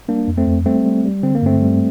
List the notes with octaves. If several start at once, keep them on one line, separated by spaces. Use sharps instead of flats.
G3 A#3 D4
F2
A3 C4
F2
G3 A3 C4
G3
G3
D3 C4
A#3
G2 A3 C4
G3